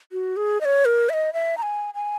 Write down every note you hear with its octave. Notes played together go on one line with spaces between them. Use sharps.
F#4
G#4
D#5
C#5
A#4
E5
D#5
E5
A#5
G#5
G#5